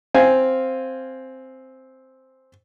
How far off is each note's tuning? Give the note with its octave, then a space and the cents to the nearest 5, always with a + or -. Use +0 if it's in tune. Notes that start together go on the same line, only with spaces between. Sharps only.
C4 +0 F5 +0 G#5 +0